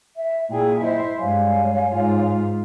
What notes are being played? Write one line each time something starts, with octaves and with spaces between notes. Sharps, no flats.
E5
A#2 E4 G#4 G5
E4 C5 D#5
G2 G#3 C#5 F5 G#5
G#2 F4